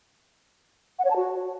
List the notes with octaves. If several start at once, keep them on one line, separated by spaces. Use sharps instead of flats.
F#5
C#5
A5
F#4